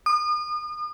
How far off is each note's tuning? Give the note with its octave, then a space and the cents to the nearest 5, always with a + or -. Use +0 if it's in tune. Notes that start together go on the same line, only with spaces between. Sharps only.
D#6 -40